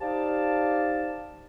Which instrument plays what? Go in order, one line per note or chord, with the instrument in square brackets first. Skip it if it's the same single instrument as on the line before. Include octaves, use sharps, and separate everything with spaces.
[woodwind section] D#4 G4 C5 D5 F5 A5